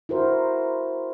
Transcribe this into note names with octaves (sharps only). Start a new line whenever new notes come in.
E4 F#4 A#4 C5